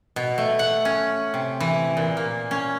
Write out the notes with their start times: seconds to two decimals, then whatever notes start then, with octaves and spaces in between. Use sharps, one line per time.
0.16 B2
0.38 A3
0.59 F#5
0.85 C#4
1.34 C3
1.60 E3
1.97 A#2
2.17 A#3
2.51 C#4